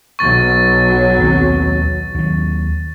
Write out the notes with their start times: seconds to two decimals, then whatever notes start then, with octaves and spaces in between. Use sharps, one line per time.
0.19 B1 F#3 C#6 A6
1.19 D#2 C4
2.14 D#2 F#3